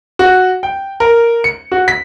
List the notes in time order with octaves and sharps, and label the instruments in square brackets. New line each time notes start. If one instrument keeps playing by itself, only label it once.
[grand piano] F#4
G5
A#4
C#7
F#4
B6